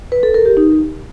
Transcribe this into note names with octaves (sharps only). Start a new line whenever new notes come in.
B4
A4
A#4
G4
D#4